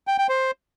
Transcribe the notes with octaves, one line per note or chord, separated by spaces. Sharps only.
G5
G5
C5